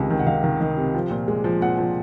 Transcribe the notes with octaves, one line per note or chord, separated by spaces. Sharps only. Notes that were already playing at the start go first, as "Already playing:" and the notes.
Already playing: C#2 C3 D#3 D#5
D#3
F#5
D#3 F5
D#3
D#3
C3
F3
A#2
G#3
F3
A#2 F#5
F3